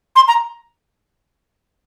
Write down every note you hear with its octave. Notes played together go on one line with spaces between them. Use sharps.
C6
A#5